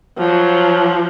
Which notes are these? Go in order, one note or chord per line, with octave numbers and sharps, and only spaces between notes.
F3 F#3